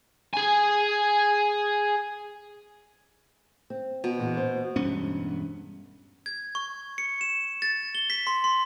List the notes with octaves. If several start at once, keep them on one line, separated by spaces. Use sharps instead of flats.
G#4 G#5
C4
B2
E2 A#2 E3
C5
E1 G2 B3 C#4
G#6
C#6
C#7
E7
A6
G7
B6
C6
C6